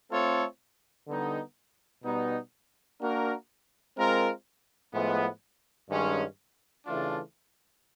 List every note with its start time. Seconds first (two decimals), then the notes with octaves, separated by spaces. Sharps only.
0.11 A3 C4 F4 A4 C#5
1.07 D3 G3 B3 D#4 G4
2.04 B2 G3 B3 D#4
3.01 A#3 D4 F#4 A#4
3.97 G#3 C4 F4 A#4
4.93 A2 F3 G#3 B3
5.90 G2 D#3 G#3 C#4 F#4
6.87 C#3 E3 A3 D4 F4